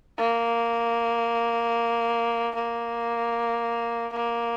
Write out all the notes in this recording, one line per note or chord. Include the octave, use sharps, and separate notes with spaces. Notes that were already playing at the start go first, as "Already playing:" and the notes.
A#3
A#3
A#3